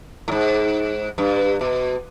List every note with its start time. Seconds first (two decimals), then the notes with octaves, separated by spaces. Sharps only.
0.28 A2
0.31 G#2
1.18 G2
1.61 B2